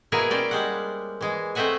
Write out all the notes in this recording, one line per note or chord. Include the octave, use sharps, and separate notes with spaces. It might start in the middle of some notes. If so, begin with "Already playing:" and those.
B2 A#3 E4 G#4 A#4 B4
C#4 C5 D5 G5
G3 G#3 F#5
E3 G#3
A3 C4 D#5 E5 F#5 G#5